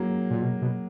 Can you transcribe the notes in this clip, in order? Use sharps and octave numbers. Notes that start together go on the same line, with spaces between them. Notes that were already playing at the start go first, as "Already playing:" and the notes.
Already playing: F#3 G#3 A#3
A#2
B2
B2